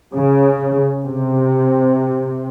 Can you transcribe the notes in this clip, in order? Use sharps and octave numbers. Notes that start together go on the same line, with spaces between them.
C#3
C3